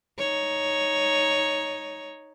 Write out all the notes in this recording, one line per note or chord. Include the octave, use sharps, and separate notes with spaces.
D#4 C#5